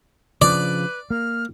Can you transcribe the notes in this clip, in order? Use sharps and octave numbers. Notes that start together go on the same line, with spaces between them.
C#3 F3 D4 B4 D5
A#3 F6